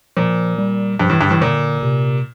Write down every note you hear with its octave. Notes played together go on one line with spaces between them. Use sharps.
A#2 F3
G3
G2 F3
A2 E3
G2 D3
A2 E3
A#2 D3
C3